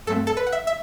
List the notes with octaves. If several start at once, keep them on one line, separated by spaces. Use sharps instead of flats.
G2 F#3 A3 C4 A4
A4
B4
F#5
E5
E5